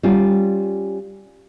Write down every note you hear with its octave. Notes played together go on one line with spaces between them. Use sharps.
G3 C#4 F4